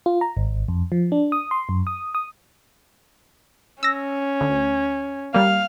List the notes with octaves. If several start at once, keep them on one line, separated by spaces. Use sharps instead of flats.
F4
A#5
G#1
F2
F3
D4
D#6
C6
F#2
D#6
D#6
C#4 E6 A#6
D2
G3 A#3 F5